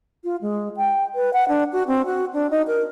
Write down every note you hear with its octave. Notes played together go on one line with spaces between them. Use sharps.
F4
G#3
G5
B4
F#5
D4
F#4
C4
F#4
D4
D#4
A#4